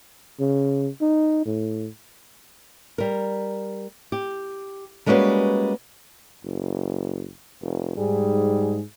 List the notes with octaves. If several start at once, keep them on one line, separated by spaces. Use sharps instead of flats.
C#3
D#4
A2
G3 A#4
G4
G3 G#3 A#3 C#4 F#4 B4
F#1
F1
G#2 G3 G#4